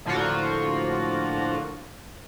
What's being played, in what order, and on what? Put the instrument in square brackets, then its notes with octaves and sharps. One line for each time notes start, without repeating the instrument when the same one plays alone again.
[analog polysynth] A2 D3 F3 A#3 F4 F#4